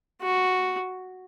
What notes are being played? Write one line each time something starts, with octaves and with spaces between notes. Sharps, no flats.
F#4